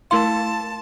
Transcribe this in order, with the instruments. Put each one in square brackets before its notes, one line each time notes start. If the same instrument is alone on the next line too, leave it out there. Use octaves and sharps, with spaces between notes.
[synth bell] A3 E4 F5 [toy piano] A#4 C6 [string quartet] A5